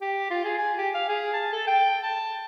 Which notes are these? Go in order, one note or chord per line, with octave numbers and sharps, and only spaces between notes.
G4
F4
G#4
G#5
G4
F5
G#4
A5
A4
G5
A5